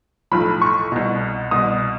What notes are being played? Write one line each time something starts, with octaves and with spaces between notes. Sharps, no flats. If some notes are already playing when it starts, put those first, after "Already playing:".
B1 A2 F3 B5
C#6
C2 B2
C2 B2 D#6